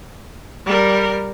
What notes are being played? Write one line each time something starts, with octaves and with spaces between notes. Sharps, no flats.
G3 A#4